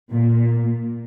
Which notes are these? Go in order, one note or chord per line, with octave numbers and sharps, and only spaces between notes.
A#2